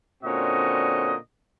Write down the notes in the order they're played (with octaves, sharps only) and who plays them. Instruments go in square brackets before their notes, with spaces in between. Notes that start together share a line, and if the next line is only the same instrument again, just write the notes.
[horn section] A#2 D3 C4 C#4 F#4 D#5